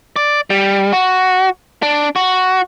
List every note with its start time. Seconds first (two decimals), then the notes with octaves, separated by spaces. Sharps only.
0.16 D5
0.50 G3
0.93 F#4
1.83 D4
2.16 F#4